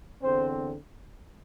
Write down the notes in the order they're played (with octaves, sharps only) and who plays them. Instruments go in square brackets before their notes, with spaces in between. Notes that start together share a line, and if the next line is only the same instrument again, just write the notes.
[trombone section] E2 D3 C4 C5